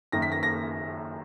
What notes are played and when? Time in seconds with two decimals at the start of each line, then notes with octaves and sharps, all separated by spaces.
0.12 F#1 F#2 D#3 A#3 A#6
0.22 B6
0.32 A#6
0.43 A#6